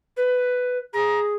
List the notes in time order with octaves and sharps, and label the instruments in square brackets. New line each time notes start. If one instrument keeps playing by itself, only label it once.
[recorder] B4
[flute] G#4 [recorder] A#5